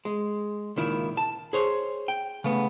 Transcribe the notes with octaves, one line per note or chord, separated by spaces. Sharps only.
G#3
C#2 A#2 D#3 E4
A5
G#4 C5 C#5
G5
C#3 A3 B3